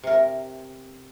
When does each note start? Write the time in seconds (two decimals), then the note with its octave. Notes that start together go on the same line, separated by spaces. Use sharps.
0.03 C3 A#4